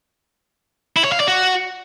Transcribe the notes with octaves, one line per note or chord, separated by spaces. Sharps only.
E4
C#5
F5
D5
F#4